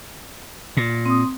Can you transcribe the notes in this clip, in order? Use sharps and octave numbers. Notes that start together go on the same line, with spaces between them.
A#2
C4 D#6